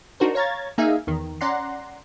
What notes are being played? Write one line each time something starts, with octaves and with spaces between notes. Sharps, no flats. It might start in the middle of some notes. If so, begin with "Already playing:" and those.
D4 D#4 F#4 A#4 C5
C#5 F5 A#5 G#6 A6
A#3 D#4 G#4 E5 F5 G#5
E2 D#3
C#4 D5 F#5 A#5 C6